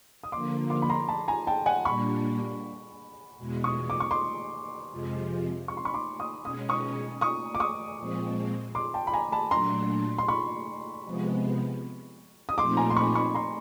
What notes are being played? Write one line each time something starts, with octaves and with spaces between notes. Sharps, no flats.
D#6
D3 F3 A#3 C6 D6
C6 D6
B5
A#5 C6
A5 B5
G#5 A#5
G5 A5
F#5 G#5
A#2 G3 A#3 D4 B5 C#6
E2 B2 G#3
C#6 D#6
D6
C#6
C6 D6
F2 C3 F3 G#3
C#6
C6
B5 C#6
C6 D6
C#6 D#6
B2 G#3 C#4 D#6
C#6 D#6
C#6 D#6
D6
C#6 D#6
A#2 F3 G#3 C4
C6 D6
G5 A5
B5
G#5 A#5
A5 B5
A#2 F#3 A3 D4 A#5 C6
C6
B5 C#6
C3 F3 G#3 B3
D#6
A#2 F3 A3 C4 D#4 C6 D6
G#5 A#5
C6
B5 C#6
B5 C#6
A#5 C6